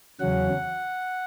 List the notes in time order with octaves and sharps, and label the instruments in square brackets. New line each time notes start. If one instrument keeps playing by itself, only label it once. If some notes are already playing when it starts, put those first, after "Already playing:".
[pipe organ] E2 C#3 F#3 C#4 F#5